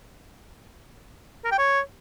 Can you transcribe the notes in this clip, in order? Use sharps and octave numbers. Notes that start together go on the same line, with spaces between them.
A#4
G5
C#5